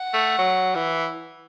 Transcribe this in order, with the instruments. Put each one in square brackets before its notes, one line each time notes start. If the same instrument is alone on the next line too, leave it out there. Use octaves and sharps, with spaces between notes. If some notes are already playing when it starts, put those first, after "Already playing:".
Already playing: [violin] F#5
[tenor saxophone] A3
F#3
E3